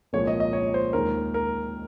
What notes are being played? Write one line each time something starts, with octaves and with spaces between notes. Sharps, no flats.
C2 A#2 F3 G#3 C#5
D#5
D#5
C#5
C5
D#2 D#3 G#3 A#4
A#4